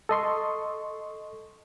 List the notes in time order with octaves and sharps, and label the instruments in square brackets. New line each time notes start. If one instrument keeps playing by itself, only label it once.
[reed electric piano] A4 D#5 C6 C#6